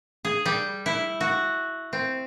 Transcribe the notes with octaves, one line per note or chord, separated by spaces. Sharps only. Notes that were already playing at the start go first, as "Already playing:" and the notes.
G#4
G3
E4
F#4
C4